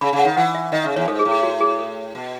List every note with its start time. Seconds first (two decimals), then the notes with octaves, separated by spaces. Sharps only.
0.01 C#3 B5
0.13 C#3
0.19 F#5
0.25 D#3
0.37 E3 F#5
0.55 E5
0.72 D#3 D#5
0.84 C#3 E5
0.96 E2 C#5
1.08 G#2 A4
1.19 G#4
1.25 A2
1.31 G#4
1.43 F#4
1.61 G#4
1.79 A4
2.15 B2